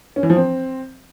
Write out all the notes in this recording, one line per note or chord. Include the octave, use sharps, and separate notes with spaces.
C#4
E3
F3
C4